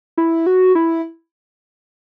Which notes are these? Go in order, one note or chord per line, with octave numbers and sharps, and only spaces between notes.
E4
F#4
E4